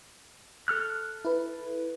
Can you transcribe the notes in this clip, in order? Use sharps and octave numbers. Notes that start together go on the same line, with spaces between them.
A4 F6 F#6
E4 B4